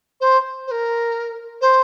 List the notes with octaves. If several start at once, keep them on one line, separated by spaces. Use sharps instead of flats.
C5
C5
A#4
C5